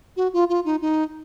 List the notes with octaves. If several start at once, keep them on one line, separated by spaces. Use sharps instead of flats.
F#4
F4
F4
D#4
D#4